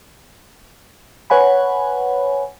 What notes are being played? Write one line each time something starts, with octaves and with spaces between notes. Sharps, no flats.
B4 C#5 F#5 G#5 B5